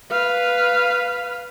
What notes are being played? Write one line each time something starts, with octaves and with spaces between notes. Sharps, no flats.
B4 F5